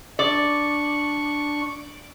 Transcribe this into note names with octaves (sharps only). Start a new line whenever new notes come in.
D4 D5 C#6